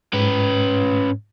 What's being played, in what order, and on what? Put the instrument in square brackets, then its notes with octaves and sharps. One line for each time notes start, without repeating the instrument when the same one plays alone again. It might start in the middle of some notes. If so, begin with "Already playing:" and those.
[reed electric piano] G#2 [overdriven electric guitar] C#4 B4